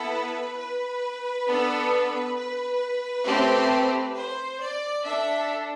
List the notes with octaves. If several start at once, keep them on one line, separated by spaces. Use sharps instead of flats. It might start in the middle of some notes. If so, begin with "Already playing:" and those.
Already playing: B3 E4 A4 B4
B4
B3 D4 A4
B4
A3 C4 G4
C5
D5
D4 A4 E5